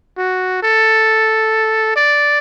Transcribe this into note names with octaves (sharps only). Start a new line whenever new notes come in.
F#4
A4
D5